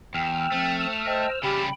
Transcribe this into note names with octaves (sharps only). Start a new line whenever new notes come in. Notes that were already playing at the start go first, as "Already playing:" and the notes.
E2 G5 E6 F6
F3 A3 C4
C5 D#5 G5 A5
C#3 G3 G4 G5 B5